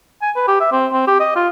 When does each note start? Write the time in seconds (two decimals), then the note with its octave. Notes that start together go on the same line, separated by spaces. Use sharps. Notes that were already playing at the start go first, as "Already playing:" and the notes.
0.22 G#5
0.36 B4
0.48 G4
0.61 E5
0.72 C4
0.93 C4
1.08 G4
1.20 D#5
1.36 F4